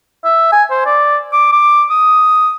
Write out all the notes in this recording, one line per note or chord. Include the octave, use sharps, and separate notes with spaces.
E5
G#5
C5
D5
D6
D6
D#6